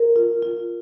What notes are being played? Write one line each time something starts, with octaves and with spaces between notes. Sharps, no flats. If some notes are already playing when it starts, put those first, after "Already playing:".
Already playing: A#4
F4
F4